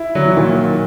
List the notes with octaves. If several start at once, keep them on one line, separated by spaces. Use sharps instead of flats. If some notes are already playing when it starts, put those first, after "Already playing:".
Already playing: E4
D3 F#3
E3
A#2 D#3
A#2